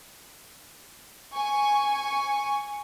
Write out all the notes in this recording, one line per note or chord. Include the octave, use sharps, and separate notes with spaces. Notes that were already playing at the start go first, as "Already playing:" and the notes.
G#5 C#6